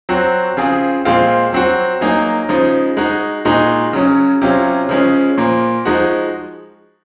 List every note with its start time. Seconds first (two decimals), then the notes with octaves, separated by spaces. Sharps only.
0.09 F#3 C4 F#4
0.57 C#3 F3 C4 F4 G#4
1.05 A#2 F3 G#3 C4 F4
1.53 F#3 C4 F#4
2.01 F#3 A#3 D#4 G#4
2.49 C#3 F3 G#3 D#4
2.97 G#3 D#4 F#4
3.45 A#2 G#3 D#4 F#4
3.93 C#3 F#3 C#4
4.42 C3 F#3 C#4 F4
4.89 C#3 F3 G#3 C#4
5.37 A#2 F3 A#3
5.85 F3 G#3 D#4 F#4